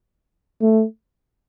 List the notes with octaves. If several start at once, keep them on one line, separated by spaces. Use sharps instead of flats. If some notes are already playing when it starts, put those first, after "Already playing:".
A3